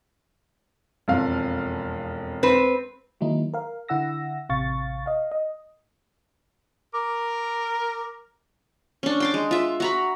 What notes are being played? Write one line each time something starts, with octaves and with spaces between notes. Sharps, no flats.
E1 F2 F5
C4 B4
D#3 F#3 G#3 A#3 D#4 E4
A#4 F5
D3 E4 F#5 E6 A#6
A1 C3 F5 C#6 A6
D#5 F5
D#5
A#4 D6
C#4 D4
G5 C6 D6
G#3
F4 E5
F#4 A#5 B5